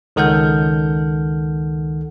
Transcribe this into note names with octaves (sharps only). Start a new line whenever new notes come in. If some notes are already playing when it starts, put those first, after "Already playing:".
C#2 D#3 A4 F#5 F6 G6